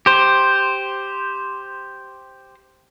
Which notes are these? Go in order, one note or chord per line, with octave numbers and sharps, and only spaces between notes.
G4 C5